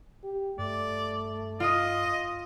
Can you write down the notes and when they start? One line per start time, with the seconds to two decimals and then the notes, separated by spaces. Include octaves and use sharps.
0.24 G4
0.59 G2 A3 D5
1.60 F4 D#5 D#6